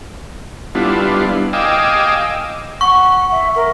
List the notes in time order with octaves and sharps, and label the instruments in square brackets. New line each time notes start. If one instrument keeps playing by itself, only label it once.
[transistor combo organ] G3 B3 D4 E4 F4
D#5 F5 G5 G#5 D6 E6
[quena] F#5 [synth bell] C#6
[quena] E5
A#4